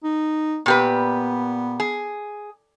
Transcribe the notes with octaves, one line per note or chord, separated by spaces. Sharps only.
D#4
A#2 B3 G4 B4
G#4